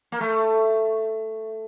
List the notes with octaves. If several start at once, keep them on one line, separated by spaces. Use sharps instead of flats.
A#3
A3